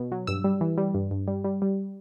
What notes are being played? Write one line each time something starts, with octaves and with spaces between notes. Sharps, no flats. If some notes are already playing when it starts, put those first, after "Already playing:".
Already playing: B2
F#3
G2 E6
G3
E3
G3
G2
G2
G3
G3
G3